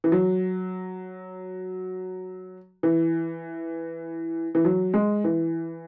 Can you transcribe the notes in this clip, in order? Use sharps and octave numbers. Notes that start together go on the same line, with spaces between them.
E3
F#3
E3
E3
F#3
G#3
E3